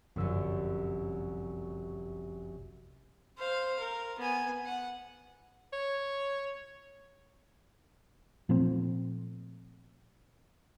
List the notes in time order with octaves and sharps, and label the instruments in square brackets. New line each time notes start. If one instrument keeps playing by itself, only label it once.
[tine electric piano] G1 F3 E6 [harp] C2 F#2
[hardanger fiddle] C5 F5
A#4
B3 G#5
F#5
[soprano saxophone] C#5
[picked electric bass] A#2 F3 A3 C4